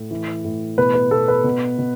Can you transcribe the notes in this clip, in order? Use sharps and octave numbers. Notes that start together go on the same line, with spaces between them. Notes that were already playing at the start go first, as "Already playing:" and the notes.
Already playing: A2
E3
A2
B2 B4
B4
B2 A4
B4
B2
B2